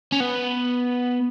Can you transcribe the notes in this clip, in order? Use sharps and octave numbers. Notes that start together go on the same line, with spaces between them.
C#4
B3